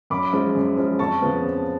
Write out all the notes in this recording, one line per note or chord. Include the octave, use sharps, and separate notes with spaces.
F#2 B5 D6
F3 G#3 C#4
F#2
F3 G#3 C#4
F2 A5 C#6
C#3 F3 B3
F2